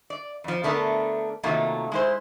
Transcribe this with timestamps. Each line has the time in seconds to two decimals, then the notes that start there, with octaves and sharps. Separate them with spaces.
0.10 D5
0.44 F2 F3
0.63 D3 A3 B3 D4 A#4
1.43 C3 D#3 F#3 A3 A#3 F4
1.92 G#3 E4 C5